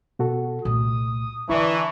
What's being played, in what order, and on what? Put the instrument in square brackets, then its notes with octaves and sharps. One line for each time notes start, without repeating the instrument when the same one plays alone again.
[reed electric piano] B2 F#4 A4
[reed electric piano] C2 [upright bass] A#2 A3 [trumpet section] D#6
[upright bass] D3 [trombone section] E3 [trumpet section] D4 A#5 C#6 [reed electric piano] E4 D5